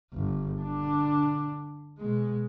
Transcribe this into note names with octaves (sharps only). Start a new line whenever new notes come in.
G1
D3 D4
B2 G#3